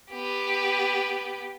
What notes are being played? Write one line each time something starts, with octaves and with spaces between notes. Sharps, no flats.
B3 G4